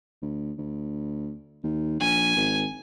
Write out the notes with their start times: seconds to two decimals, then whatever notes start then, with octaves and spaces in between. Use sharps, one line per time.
0.22 D2
0.58 D2
1.63 D#2
2.00 A#1 G#5
2.36 G#1